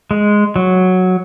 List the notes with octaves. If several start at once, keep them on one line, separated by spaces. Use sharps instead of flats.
G#3
F#3